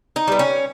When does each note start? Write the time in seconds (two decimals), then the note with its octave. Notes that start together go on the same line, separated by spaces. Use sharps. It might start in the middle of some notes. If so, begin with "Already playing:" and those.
0.16 D#4
0.28 G3 B3
0.39 C#4